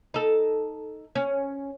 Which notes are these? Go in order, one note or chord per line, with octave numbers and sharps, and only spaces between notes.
D#4 A4
C#4